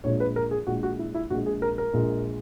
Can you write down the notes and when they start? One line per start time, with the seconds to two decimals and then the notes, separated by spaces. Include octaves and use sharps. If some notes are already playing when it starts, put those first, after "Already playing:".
0.04 A#1 A#2 G#3 C#5
0.20 B4
0.36 A#4
0.51 G#4
0.67 A#1 A#2 G#3 F#4
0.83 F#4
0.99 E4
1.14 E4
1.30 A#1 A#2 G#3 F#4
1.46 G#4
1.62 A#4
1.78 A#4
1.93 A#1 A#2 G#3